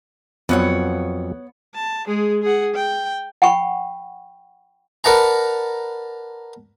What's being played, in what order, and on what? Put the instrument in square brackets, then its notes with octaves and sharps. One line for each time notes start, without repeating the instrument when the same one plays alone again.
[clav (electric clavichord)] F2 F3 F#3 [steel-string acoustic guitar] B3 C#5 F#5
[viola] A5
G#3 G#4
G#4 F#5
G5
[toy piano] F#5 G5 B5 C#6
[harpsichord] A#4 B4 D5 F#5 A5 A#5